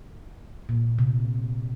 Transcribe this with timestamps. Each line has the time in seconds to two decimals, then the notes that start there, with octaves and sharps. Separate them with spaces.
0.69 A#2
0.99 C3